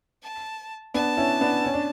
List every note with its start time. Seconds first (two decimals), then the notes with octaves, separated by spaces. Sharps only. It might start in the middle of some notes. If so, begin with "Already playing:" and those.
0.23 A5
0.94 B3 D4 A5
1.17 C#4 E4
1.41 B3 D4
1.65 C#4
1.74 D4